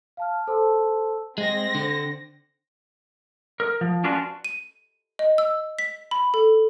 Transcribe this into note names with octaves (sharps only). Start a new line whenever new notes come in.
F5 A5 F6
A4 C5 A5 C6 E6
G#3 C4 A#6
D3
A#4
F3
C#4 D4 F4 F#4 B4
D#7
D#5
E6
B6
B5
A4